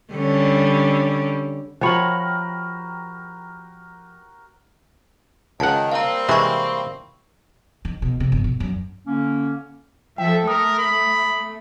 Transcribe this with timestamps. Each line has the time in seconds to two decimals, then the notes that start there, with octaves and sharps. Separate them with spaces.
0.13 D3 G3 C#4
1.81 F3 F#4 G4 A#4 C#5 G5 B5 F#7
5.60 C#2 D#3 F#5 A5
5.92 G3 A#3 C4 F5 A#5
6.29 C3 E3 G#3 B5 C#6
7.85 D#3
8.02 B2
8.20 C3
8.32 G1
8.44 B2
8.60 F#2
9.07 D3 A#3 C#4
10.18 F3 A4 E5 G5
10.48 A3 A#4 D#6
10.79 B5